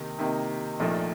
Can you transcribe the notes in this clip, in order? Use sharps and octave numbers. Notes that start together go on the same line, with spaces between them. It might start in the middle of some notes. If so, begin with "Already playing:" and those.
Already playing: C3 D#3 A#3 D#4
C3 D#3 A#3 D#4
A#1 A#2 F3 A3 D#4